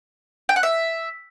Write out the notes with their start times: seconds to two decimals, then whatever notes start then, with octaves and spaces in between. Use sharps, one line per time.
0.49 G5
0.56 F#5
0.63 E5